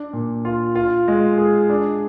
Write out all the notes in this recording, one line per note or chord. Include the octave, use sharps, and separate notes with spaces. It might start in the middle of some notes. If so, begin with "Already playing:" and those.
Already playing: D4
A#2
F4
F4
G#3
G#4
D4